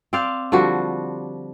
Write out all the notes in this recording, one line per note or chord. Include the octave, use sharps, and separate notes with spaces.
C4 C5 D5 F5
D3 F3 G3 F#4